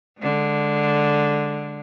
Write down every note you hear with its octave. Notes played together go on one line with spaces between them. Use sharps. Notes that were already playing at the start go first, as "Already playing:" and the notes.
D3 G#3